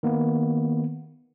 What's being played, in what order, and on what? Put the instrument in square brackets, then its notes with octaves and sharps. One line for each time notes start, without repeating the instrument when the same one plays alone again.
[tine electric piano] D#3 A#3 B3